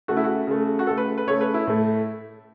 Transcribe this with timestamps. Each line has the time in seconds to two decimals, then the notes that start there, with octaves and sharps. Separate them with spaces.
0.08 C#3 A3 F#4
0.17 E4
0.24 F#4
0.47 C#3 A3
0.79 F#4
0.87 C#3 A3 A4
0.98 B4
1.18 B4
1.27 C#3 A3 C#5
1.41 B4
1.54 E4
1.67 A2 A3